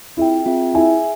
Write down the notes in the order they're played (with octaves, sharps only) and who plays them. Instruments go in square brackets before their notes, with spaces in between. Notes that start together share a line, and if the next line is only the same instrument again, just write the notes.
[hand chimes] C4 F4 G#4 E5 G5 [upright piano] E4
[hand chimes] C4 F4 G#4 E5 G5
[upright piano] E4 [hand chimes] G#4 E5 G#5